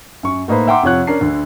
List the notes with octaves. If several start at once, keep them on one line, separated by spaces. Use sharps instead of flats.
F#2 C#6
A2 A#3 D#4 B4 C5 B5
E5 F#5 G5 A#5 C6 D6
F2 C3 F3 C#5 F#5 F#6
C#4 D4 A#4 C7
D2 D3